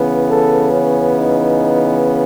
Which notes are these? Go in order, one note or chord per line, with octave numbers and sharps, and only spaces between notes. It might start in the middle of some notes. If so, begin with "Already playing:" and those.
Already playing: C#3 E3 B3
A4
C#4
D#4